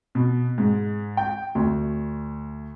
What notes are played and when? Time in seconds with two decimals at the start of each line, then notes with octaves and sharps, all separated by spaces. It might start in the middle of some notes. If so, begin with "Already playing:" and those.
0.15 B2
0.58 G#2
1.17 G5
1.55 D2